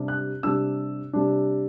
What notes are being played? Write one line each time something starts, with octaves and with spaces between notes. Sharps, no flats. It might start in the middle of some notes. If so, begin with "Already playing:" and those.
Already playing: C3 G3 D4
F#6
C3 G3 D4 E6
C3 G3 D4